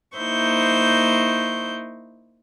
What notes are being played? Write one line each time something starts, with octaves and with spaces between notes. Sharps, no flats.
A#3 D#4 E4 C5 C#6 G6